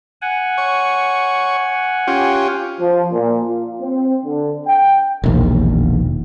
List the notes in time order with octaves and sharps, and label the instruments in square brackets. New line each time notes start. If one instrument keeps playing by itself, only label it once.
[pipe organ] F#5 G#5
[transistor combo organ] C#5 C#6
C#4 F4 G4
[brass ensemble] F3
A#2
F4
C4
D3
G5
[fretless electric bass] E1 A#1 D#2